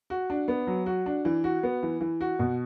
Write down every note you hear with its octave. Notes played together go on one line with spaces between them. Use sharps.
F#4
D4
B3
F#3
F#4
D4
E3
F#4
B3
E3
E3
F#4
B2